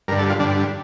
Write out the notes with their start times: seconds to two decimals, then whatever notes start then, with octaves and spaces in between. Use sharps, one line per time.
0.08 G2 A#4
0.12 D3
0.19 A4
0.29 F4
0.39 G2 D3 D4